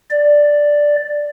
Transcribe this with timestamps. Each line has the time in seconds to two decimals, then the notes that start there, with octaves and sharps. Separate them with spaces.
0.10 D5